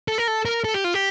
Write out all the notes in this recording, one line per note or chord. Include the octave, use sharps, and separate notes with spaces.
A4
A#4
A4
A#4
A4
G4
F4
G4